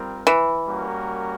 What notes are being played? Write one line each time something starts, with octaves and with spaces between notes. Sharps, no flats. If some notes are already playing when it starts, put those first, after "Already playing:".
Already playing: G3 C4 F4 A#4
E3
G3 A#3 C#4 F#4 A#4